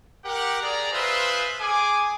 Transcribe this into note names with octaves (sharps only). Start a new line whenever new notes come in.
G4 A#4 F#5
G#4 D5 A#5
G#3 F4 B4 C5 E5 F5
G#4 G#5 D6